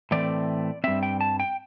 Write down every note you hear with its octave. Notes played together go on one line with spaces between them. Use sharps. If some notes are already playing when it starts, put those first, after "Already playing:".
A2 E3 A3 C4 D5
G2 G3 C4 E5
G5
A5
G5